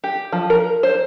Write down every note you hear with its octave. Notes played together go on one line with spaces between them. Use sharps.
G4
F3
A#4
C5